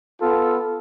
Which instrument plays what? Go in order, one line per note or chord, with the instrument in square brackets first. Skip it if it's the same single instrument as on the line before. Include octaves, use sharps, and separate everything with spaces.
[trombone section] B3 F4 A4